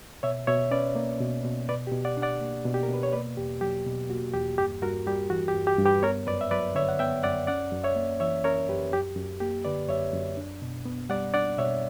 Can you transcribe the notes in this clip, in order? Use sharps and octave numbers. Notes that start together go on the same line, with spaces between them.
B2 C#5 E5
B2 C#5 E5
C#4 B4 D5
A#3
B2
B2
B2 B4 D5
G4
B2
D5 F#5
D4
D5 F#5
A#3
B2
G4
A#4
B2 B4
C#5
A#3 B4 D5
E2 G4
F#3 G4
B2
A#3 F#4
E2 G4
G2 G4
G2 F#4 A#4
G3 G4
E3 F#4
G4
G2
G4
G2
G4 B4
B3 A#4 C#5
F#2 B4 D5
E5
F#3 B4 D5
D3 C#5 E5
F#5
B3 E5 G5
F#2 D5 F#5
C#4 D5 F#5
F#2
C#5 E5
A#3
E3 C#5 E5
C#4 A#4 C#5
F#2 G4 B4
F#2 G4
F#2
A#3 G4
D3 B4 D5
F#2 C#5 E5
F#2
D4
B2
B3
G3 D5 F#5
D4 D5 F#5
B2 C#5 E5